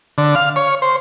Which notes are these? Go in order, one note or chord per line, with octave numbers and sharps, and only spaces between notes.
D3
F5
C#5
C5